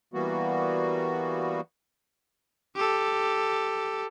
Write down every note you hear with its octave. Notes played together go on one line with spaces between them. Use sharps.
E3 G3 A#3 B3 F#4
G4 A4